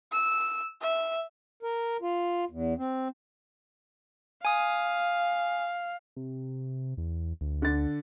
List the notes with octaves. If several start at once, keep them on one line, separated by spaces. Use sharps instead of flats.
E6
E5
A#4
F4
E2
C4
F5 G#5 D#6
C3
E2
D2
D3 A6